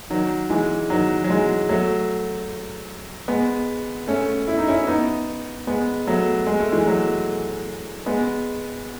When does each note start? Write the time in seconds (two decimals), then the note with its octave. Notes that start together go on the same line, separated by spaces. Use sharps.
0.10 D#3 F#3
0.50 E3 G#3
0.90 D#3 F#3
1.24 F#3
1.29 E3 G#3
1.69 F#3 A3
3.28 G#3 B3
4.08 A3 C#4
4.48 E4
4.58 D#4
4.68 C#4 E4
4.87 B3 D#4
5.67 G#3 B3
6.07 F#3 A3
6.47 G#3
6.60 A3
6.72 E3 G#3
6.87 F#3 A3
8.06 G#3 B3